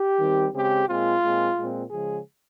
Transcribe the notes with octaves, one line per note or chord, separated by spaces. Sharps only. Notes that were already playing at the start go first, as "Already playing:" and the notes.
Already playing: G4
D#3 G3 C4
C#3 G#3 C4 G4
A#2 G#3 C4 F4
A#2 G#3 C4
A#2 G#3 C4
C#3 F3 G#3 G#4